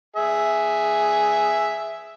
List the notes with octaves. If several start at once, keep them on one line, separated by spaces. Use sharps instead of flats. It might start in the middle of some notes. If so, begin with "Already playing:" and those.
G#4 E5